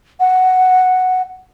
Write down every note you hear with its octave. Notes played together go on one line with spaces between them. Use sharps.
F#5